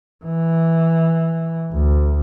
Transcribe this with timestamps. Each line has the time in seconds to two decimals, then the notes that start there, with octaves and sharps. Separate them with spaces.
0.25 E3
1.72 D2